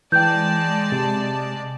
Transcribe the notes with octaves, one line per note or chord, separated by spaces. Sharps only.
E3 G#3 D5 G5 A5 G6
C3